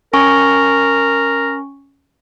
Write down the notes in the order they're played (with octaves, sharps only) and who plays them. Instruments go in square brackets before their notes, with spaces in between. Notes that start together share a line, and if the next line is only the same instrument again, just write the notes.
[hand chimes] C#4 G#5 C#6 [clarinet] A#4